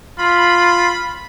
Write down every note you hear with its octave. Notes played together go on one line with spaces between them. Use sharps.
F4 B5